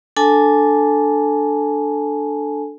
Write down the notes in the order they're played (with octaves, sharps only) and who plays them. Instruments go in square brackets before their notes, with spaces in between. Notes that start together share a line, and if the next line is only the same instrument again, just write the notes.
[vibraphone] D4 A4 G#5 A5